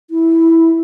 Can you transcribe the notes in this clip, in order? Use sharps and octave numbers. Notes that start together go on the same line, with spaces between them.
E4